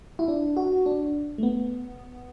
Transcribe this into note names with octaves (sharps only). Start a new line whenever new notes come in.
E4
D4
F#4
D4
A3
B3